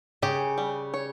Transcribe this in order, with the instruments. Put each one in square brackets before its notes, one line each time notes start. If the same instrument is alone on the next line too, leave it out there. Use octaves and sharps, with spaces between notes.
[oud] C#3 [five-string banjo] G4
[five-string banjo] G3
C#5